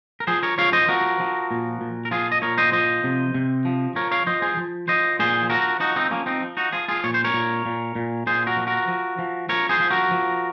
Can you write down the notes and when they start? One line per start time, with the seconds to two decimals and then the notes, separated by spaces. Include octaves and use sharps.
0.20 A#4
0.27 F3 G#4 C5
0.43 A#4 C#5
0.58 F3 C#5 F5
0.73 C5 D#5
0.89 F3 F#4 A#4
1.20 F3
1.51 A#2
1.81 A#2
2.05 A#4
2.11 F3 F4 G#4
2.32 D#5
2.42 A#2 A#4 C#5
2.58 C5 D#5
2.73 F3 C5 D#5
3.04 C3
3.34 C3
3.65 F3
3.95 F3 A#4 C#5
4.11 C#5 F5
4.27 F3 C5 D#5
4.42 G#4 C5
4.57 F3
4.88 F3 C5 D#5
5.19 A#2 G#4 C5
5.50 F3 F#4 A#4
5.80 F3 D#4 F#4
5.96 C4 D#4
6.11 F3 A#3 C#4
6.26 C4 D#4
6.41 F3
6.57 D#4 F#4
6.72 F3 F4 G#4
6.88 F4 G#4
7.04 A#2 C#5
7.14 C5
7.24 A#4 C#5
7.34 A#2
7.66 A#2
7.95 A#2
8.27 A#2 G#4 C5
8.47 F#4 A#4
8.57 F3
8.67 F#4 A#4
8.88 F3
9.19 F3
9.49 F3 A#4 C#5
9.69 G#4 C5
9.80 F3
9.90 F#4 A#4
10.11 F3